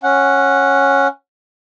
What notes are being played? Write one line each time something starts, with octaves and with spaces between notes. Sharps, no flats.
C#4 F#5